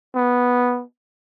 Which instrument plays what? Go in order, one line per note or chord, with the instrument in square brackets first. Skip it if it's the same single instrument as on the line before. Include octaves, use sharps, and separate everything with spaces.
[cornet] B3